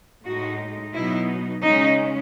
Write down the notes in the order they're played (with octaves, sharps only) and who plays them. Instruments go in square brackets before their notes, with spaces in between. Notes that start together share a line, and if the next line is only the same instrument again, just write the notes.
[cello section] A2 G#3 D#4 F#4
B2 F#3 B3 D#4 E4
C#3 G#3 C#4 D#4